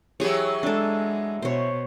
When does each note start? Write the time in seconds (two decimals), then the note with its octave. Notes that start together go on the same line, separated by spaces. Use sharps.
0.20 E3 F#3 G4 G#4 C#5
0.63 G#3 D4 A4
1.42 B2 C5 C#5